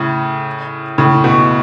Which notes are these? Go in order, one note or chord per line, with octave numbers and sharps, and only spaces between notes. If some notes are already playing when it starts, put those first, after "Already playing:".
Already playing: A2 C#3
A2 C#3
B2